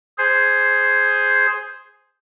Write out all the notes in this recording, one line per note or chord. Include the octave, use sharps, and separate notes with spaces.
G#4 C5